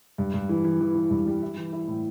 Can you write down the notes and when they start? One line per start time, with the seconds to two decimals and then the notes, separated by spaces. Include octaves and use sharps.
0.18 G2
0.34 G2
0.49 E3
0.64 E3
0.80 E3
0.95 E3
1.11 G2
1.27 G3
1.42 E4
1.57 E3
1.73 E4
1.88 A2